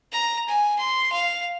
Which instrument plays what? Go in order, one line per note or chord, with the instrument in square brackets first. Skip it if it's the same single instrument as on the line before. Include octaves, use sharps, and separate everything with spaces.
[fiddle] A#5
G#5
C6
F5